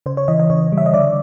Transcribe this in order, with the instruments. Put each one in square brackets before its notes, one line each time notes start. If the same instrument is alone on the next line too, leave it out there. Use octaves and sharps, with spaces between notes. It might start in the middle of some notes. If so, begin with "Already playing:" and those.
[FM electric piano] C#3 C5
C#5
E3 D#5
D#5
C#3 C#5
G3
E5
D#5
D3 D5